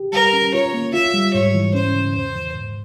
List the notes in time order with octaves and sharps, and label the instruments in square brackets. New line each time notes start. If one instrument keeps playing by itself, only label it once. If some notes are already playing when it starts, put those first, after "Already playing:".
Already playing: [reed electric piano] G4
[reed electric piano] G3 [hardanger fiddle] A#4
[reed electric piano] C#4
[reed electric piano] F4 [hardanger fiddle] C#5
[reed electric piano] A#3
[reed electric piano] F4 [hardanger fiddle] E5
[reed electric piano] G3
[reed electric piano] G#2 [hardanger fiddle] C#5
[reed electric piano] E3
[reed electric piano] C#4 [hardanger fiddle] C5
[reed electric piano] C#3
[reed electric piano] E2 [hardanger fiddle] C5
[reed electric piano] E3
G#2